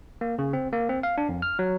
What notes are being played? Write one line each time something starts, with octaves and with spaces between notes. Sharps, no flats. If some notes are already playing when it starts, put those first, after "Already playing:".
A#3
C#3
C4
A#3
C4
F5
D4
F2
F6
F#3